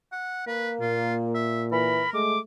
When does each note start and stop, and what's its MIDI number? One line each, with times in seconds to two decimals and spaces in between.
0.12 0.44 78
0.47 1.43 58
0.47 0.71 71
0.81 2.08 46
0.81 1.14 65
1.35 1.64 76
1.72 2.02 52
1.72 2.19 70
1.72 2.10 83
2.14 2.37 56
2.14 2.40 57
2.14 2.39 86